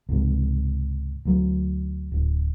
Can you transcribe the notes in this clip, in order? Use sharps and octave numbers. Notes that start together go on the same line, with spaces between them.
C#2 G#2 C3
D2 F#3
D1